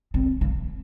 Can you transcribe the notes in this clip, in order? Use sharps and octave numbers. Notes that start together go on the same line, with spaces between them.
C4
A#3